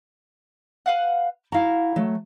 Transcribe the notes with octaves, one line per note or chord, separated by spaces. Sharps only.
B4 F5 F#5
E4 F#4 F5 A#5
F#3 A3